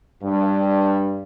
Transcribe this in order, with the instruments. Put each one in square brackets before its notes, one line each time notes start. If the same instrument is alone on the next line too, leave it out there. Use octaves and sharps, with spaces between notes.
[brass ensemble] G2